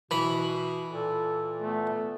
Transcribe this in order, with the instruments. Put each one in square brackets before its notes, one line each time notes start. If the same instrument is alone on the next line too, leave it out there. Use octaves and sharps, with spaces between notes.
[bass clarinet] B2 [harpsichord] E3 B5
[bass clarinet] A#2 [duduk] A4
[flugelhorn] A3 [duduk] B3